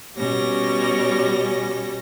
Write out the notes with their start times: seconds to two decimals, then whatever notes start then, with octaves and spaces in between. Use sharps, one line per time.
0.16 B2 G3 C#4 A#6